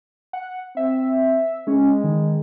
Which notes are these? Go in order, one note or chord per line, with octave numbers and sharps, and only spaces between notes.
F#5
C4 E5
G#3 C#4
D#3